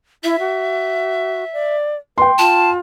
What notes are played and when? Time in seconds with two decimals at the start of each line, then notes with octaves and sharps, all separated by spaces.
0.24 E4 E5
0.40 F#4
1.53 D5
2.18 B4 G5 C6
2.38 F4 A5